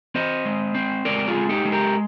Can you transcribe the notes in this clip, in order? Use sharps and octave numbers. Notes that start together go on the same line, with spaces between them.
C4 C5 D#5
G#3
C4
G#3 A#4 D5
F4 G#4
G#3
D#4 G4
G#3
G4 A#4